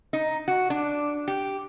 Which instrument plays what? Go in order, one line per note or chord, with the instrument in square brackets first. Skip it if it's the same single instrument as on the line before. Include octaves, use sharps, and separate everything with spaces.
[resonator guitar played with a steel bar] D#4
F#4
D4
G4